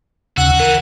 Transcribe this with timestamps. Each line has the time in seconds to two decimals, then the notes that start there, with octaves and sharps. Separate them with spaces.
0.37 D#2 C#3 F#4 F#5 E6
0.60 E3 A#4